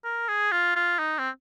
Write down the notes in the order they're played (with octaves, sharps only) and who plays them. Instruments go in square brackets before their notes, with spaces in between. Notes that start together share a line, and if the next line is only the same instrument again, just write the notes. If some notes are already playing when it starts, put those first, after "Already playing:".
[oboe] A#4
G#4
F4
F4
D#4
C4